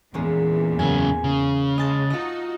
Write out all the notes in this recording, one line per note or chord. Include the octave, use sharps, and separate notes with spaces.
E2 A#2 E3 G#3 A#3 C#4
F#2 C#3 G#5
C#3
G#3 D#5 A5 A6
D#4 F4 F#4 D#5